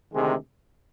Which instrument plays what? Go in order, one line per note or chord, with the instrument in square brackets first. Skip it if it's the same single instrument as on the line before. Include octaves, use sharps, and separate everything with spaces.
[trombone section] D2 C3 D#3 G#3